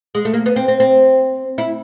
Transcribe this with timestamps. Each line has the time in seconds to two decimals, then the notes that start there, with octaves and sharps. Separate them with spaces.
0.15 G#3
0.25 A3
0.34 A#3
0.46 B3
0.56 C4
0.68 C4
0.80 C4
1.58 E4